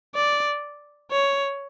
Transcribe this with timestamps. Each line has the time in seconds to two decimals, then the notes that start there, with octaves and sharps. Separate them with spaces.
0.15 D5
1.11 C#5